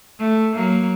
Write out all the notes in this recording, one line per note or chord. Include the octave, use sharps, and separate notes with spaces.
A3
F#3 A#3